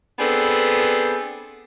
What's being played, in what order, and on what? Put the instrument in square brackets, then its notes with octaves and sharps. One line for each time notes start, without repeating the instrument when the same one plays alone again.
[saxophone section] B3 C4 D4 G#4 A4 B4